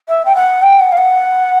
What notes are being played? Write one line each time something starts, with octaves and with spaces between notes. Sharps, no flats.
E5
G5
F#5
G5
F#5
F5
F#5